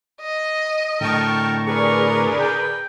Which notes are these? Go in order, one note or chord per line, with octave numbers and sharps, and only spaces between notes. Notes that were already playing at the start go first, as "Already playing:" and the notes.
D#5
A2 D3 A#4 G5 A5 C#6
G#4 A#4 B4 D5 C#6
G5